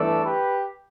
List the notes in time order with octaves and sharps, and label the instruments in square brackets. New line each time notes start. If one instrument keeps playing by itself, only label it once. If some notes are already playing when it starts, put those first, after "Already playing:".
Already playing: [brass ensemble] G1 G2 E3 A3 D4 A4 D5
G4 B4